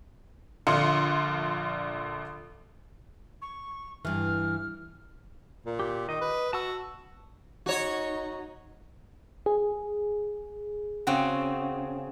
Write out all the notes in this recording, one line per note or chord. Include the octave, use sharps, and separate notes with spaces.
A#1 D3 F4 C6 C#7
C#6
G2 E3 F6
A#2
G4
D#3 D#5
B4
F#4 A5 E6
D#4 F#4 C#5
G#4
C#3 C4 F#4